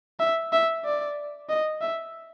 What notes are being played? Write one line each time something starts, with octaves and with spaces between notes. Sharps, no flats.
E5
E5
D5
D#5
E5